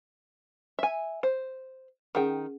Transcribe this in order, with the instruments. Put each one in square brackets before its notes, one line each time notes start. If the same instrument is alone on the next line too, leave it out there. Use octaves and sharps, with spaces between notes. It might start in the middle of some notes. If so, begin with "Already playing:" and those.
[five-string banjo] E5 G#5
C5
[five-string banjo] D#3 G5 [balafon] C#4 G#4 F#5